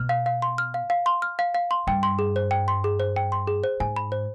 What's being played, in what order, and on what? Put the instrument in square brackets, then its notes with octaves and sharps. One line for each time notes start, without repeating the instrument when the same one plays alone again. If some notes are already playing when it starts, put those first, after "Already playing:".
Already playing: [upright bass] B2 [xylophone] F6
[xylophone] F5
F5
C6
F6
F5
F5
C6
F6
F5
F5
C6
[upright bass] G2 [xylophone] G5
[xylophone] C6
G#4
C5
G5
C6
G#4
C5
G5
C6
G#4
C5
[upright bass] G#2 [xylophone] G#5
[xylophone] B5
C5